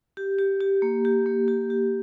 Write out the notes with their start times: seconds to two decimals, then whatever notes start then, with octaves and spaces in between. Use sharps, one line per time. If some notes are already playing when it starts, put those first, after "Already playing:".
0.17 G4
0.39 G4
0.61 G4
0.82 A#3
1.05 G4
1.26 A#3
1.48 G4
1.70 G4